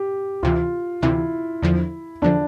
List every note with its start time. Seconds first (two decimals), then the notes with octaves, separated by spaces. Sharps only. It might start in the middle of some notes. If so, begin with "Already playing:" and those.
Already playing: G4
0.43 D2 C3 E3 F4
1.02 D2 C3 E3 E4
1.62 E2 D3 F3
2.22 E2 D3 F3 D4